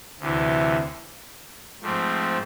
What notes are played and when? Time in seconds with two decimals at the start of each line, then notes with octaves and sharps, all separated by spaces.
0.20 D2 C3 E3
1.81 G#2 F3 A3 C4